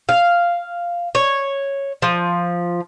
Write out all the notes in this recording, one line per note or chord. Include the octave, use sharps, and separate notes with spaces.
F5
C#5
F3